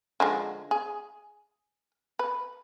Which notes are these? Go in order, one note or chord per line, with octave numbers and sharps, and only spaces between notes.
D3 F3 G#3
G#4
B4